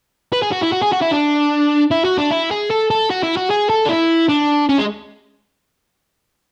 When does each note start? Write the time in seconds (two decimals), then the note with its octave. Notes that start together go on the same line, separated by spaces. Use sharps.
0.32 B4
0.42 G#4
0.52 F#4
0.62 E4
0.72 F#4
0.82 G#4
0.92 F#4
1.01 E4
1.11 D4
1.91 E4
2.05 F#4
2.18 D4
2.31 E4
2.51 G#4
2.71 A4
2.90 A4
3.10 F#4
3.23 E4
3.36 F#4
3.50 G#4
3.69 A4
3.86 D4
3.90 E4
4.29 D4
4.69 C#4
4.78 G#3